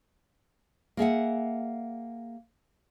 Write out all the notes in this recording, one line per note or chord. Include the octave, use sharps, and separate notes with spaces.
A#3 G#4 E5 F#5